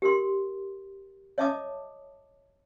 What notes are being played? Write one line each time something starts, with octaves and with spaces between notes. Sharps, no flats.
G4 A#4 C6
C#5 D#5 E5 A5 D6 D#6